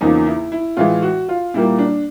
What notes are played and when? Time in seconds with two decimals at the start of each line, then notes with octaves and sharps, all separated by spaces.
0.01 E2 C#3 F3 A#3 D#4
0.27 E4
0.52 E4
0.77 A2 E3 G#3 F4
1.02 F#4
1.29 F4
1.54 A#2 G3 A#3 E4
1.79 D4